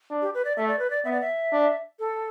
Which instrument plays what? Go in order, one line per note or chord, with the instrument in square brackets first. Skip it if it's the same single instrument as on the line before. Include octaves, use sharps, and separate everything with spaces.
[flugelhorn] D4
[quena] G4
B4
D5
[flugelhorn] A3 [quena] E5
[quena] D5
B4
D5
[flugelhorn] B3 [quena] E5
[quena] D5
E5
[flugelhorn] D4
[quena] A4